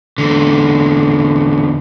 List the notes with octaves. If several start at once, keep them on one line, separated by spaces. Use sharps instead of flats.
E2 D3